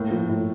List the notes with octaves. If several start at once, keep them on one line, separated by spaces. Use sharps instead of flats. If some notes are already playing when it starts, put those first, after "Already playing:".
Already playing: A2 A#3
F3
A2